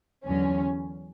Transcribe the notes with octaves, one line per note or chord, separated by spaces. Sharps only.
E2 D3 F#3 C#4